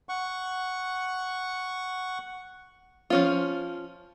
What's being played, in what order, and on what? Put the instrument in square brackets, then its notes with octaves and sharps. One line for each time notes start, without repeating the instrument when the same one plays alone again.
[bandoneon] F#5 C#6
[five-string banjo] F3 C#4 F4